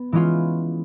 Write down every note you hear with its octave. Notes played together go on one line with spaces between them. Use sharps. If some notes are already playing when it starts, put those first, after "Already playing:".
Already playing: B3
E3 G#3 C#4 F4